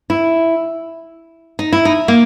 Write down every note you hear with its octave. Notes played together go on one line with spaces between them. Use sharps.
E4
D#4
E4
D#4
A#3